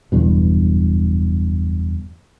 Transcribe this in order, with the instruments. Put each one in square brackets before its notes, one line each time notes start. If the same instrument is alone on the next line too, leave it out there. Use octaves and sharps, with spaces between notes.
[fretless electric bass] F#1 E2 G2 B2